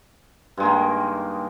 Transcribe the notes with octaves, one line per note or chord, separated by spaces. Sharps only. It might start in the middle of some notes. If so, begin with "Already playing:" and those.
G2 D#3 G#3 A#3